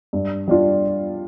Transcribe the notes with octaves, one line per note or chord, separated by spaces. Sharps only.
G2
G3 D4 F4